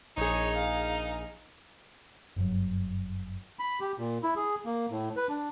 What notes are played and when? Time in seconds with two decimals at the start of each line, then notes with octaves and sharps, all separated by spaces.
0.17 A#1 D#4 G#4 C#5
0.56 F5
2.36 F#1 G2 F#3
3.59 B5
3.80 G4
3.98 A#2
4.23 E4
4.36 G#4
4.66 A#3
4.90 A2
5.16 B4
5.29 D4